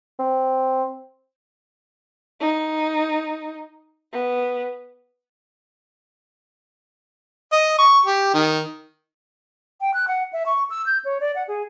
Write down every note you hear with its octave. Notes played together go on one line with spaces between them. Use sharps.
C4
D#4
B3
D#5
C#6
G4
D#3
G5
F#6
F#5
E5
C#6
E6
G6
C#5
D5
F#5
G#4